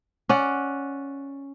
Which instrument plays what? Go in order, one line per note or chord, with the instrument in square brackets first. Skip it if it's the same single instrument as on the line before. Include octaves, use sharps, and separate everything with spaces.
[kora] C#4 D5 F#5